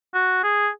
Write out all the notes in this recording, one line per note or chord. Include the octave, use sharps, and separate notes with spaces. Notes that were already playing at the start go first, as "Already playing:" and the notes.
F#4
G#4